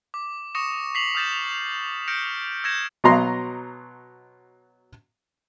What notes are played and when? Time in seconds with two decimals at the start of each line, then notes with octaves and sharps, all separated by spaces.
0.14 D6
0.55 C#6 D#6 A#6 C#7 E7
0.95 B6 C7 F7 F#7
1.15 D#6 F6 G6 A6 A#6 E7
2.08 F6 G6 A#6 C#7 D7
2.64 E6 G6 G#6 A#6 C#7 E7
3.04 B2 F#3 D#5 A#5 C6